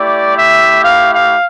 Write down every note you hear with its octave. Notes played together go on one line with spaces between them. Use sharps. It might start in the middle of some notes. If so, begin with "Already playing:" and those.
Already playing: A3 E4 G4 D5
E5
F5
F5